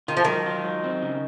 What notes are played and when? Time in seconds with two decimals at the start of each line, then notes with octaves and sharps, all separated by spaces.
0.08 D#3 F4
0.17 F3
0.25 D#3 F#3
0.46 F4
0.64 F#3
0.84 C4
1.02 C#3